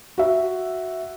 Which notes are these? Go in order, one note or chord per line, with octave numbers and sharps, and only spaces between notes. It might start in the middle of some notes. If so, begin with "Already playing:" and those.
F#4 E5